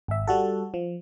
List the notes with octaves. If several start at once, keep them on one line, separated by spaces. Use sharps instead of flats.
G#1 E5
G3 F#4 A4
F3